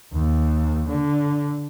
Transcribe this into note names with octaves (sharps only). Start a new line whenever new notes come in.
D#2
D3